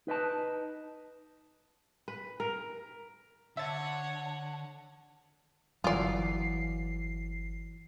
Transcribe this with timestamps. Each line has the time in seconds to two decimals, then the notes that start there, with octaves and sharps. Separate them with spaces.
0.07 D#4 B4 D#5 A5
2.08 B4
2.40 A#4
3.57 D3 C#5 E5 F#5 A5 A6
5.84 G1 E3 F#3 F4 D5 C7